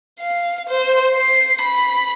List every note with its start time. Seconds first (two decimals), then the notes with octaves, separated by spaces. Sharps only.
0.20 F5
0.69 C5
1.16 C7
1.61 B5